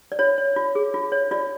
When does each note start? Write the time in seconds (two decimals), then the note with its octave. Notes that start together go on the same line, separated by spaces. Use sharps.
0.12 D5
0.19 F4 C#5
0.38 C#5
0.56 F4
0.75 G#4
0.94 F4
1.12 C#5
1.31 F4 D5